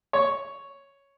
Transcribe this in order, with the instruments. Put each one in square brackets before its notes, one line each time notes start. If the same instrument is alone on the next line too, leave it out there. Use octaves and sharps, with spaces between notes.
[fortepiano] C#5